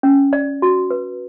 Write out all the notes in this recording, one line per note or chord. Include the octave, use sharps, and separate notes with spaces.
C#4
D5
F#4
B4